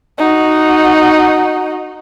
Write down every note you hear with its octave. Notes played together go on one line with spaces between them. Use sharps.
D#4 F#4